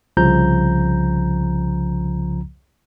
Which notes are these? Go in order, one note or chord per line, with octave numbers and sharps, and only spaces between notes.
C2 C#3 F3 A#5 G6